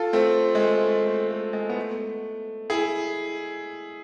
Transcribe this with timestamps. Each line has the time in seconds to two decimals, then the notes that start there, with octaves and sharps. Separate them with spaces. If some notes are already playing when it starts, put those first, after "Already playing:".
Already playing: F4 A4
0.13 A3 C4
0.55 G#3
0.60 A3
0.83 A3
1.06 A3
1.30 A3
1.53 G#3
1.69 B3
1.77 A3
2.70 E4 G#4